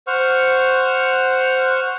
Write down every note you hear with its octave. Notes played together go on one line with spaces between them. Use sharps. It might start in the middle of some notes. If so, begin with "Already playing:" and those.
C5 F#5 C#6 F6